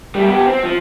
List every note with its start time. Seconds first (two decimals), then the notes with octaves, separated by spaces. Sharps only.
0.15 G3 A3
0.28 B3 G4
0.47 C4
0.64 F3